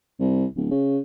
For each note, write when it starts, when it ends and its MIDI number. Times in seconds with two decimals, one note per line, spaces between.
0.20 0.45 36
0.56 0.70 26
0.71 0.98 49